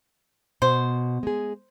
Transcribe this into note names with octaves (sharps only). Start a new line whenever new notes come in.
B2 C5
G#3 G#4